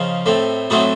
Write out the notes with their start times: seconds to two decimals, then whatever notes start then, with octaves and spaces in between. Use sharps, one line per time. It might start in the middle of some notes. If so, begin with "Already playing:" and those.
Already playing: C#3 F3 D#4
0.26 A2 A3 C4
0.70 A2 F#3 A3 C4 D#4 F#4